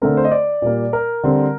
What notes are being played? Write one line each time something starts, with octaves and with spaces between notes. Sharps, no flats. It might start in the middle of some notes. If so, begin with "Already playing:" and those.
D3 A3 C4 A#4
C5
D#5
D5
A#2 G3 A#3
A#4
D3 G3 C4